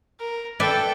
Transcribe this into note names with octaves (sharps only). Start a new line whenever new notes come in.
A#4
A4 B4 D5 E5 G5